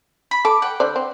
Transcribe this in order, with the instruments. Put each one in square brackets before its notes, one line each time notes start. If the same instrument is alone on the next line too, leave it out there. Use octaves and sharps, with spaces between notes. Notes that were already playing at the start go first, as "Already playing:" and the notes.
[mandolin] B5
[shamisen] A4 [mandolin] D6
[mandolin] F#5 G5
[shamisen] D3 C5 D5
C4